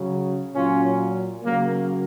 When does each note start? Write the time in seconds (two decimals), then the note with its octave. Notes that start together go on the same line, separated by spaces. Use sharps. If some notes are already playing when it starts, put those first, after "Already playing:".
Already playing: C#3 F#3
0.56 A#2 F#3 C#4 F4
1.44 C#3 F#3 A#3